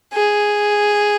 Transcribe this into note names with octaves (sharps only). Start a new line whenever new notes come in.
G#4